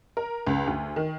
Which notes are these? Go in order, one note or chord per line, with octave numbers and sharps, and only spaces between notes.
A#4
C#2
D2
D#3